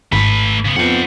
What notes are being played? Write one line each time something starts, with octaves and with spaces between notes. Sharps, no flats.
G#1 A3 B4 B5
C#3 B3
F2 B3 C5 F#5